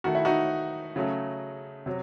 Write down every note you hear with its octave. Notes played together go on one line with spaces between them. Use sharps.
D#3 A3 F#4
E4
D#4 F#4
C#3 F#3 A3
C3 F#3